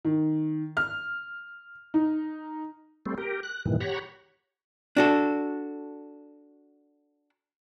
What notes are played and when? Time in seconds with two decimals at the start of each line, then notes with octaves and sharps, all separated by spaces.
0.05 D#3
0.77 F6
1.94 D#4
3.06 G3 A3 C4
3.18 G4 A#4
3.43 F#6
3.66 G2 A#2 D#3 E3
3.80 G4 C#5 F#5 A#5 B5 C#6
4.97 D4 F#4 A4